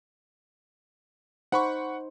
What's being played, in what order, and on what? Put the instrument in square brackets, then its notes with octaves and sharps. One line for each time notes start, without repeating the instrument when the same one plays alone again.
[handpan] D#4 C5 [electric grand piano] F#5 B5 C#6